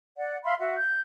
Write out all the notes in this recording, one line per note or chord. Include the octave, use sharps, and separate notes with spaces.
D5 F#5
E5 F5 B5 C6
F#4 E5 F#5
G6